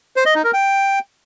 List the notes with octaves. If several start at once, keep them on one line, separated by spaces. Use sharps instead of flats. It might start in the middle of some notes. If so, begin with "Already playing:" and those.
C5
D#5
D#4
A#4
G5